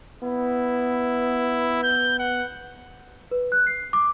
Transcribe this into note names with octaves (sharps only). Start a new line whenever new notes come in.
B3 E4
G6
F#5
B4
F#6
C7
D6